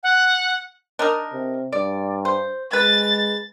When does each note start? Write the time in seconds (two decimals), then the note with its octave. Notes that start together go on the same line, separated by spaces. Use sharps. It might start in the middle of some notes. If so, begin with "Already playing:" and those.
0.03 F#5
0.99 D4 D#4 A#4
1.32 C3
1.73 G2 D5
2.25 C5
2.73 G#3 B4 A6